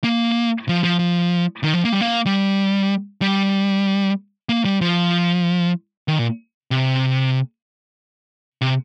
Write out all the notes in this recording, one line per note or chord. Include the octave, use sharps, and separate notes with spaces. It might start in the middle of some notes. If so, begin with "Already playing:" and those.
A#3
F3
F3
F3
D#3
F3
A#3
G3
A#3
G3
G3
A#3
G3
F3
D#3
A#2
C3
C3